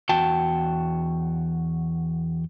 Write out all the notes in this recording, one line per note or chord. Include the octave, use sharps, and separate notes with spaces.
E2 F#4 G5 A5